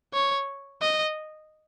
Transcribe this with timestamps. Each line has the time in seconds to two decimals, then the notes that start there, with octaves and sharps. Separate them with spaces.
0.14 C#5
0.81 D#5